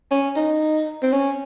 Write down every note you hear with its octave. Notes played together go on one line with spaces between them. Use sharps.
C#4
D#4
C4
C#4